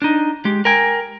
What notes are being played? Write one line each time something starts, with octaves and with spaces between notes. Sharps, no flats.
D4 D#4
G#3 G4
A#4 G5 G#5